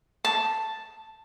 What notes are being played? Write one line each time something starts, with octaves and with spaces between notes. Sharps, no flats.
A5